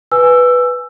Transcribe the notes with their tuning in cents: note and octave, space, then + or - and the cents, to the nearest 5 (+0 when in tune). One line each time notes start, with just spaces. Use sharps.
B4 +0 G#5 +0 E6 +15